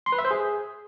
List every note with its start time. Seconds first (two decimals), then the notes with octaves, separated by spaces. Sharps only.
0.06 C6
0.12 B4
0.19 E5
0.25 C5
0.31 G#4